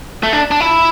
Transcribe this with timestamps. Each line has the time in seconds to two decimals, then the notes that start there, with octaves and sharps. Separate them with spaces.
0.23 A3
0.33 D4
0.51 D4
0.61 E4